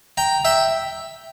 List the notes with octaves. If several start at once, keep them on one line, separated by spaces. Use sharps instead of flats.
G5 A#5
E5 G5